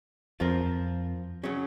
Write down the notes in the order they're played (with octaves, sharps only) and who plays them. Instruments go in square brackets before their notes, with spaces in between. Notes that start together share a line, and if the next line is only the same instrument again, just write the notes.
[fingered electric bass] F2 [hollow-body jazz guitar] F3 C4 F4 A#4
[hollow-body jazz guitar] C#3 F#3 C#4 G#4